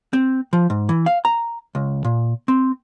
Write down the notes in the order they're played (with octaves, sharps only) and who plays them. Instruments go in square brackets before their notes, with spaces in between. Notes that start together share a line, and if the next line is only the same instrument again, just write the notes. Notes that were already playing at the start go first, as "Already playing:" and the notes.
[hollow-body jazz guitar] C4
F3
G#2
E3
F5
A#5
C#2
A#2
C4